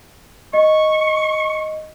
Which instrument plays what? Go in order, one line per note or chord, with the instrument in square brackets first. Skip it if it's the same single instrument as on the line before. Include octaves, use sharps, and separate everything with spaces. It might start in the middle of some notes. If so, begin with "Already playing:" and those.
[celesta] D#5 [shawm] C#6